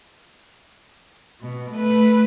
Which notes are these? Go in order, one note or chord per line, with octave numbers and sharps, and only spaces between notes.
B2
A3 B4